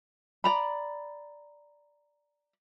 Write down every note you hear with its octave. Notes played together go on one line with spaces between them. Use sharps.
D5 A#5 B5